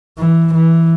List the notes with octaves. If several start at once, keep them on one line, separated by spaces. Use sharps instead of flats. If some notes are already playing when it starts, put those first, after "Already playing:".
E3
E3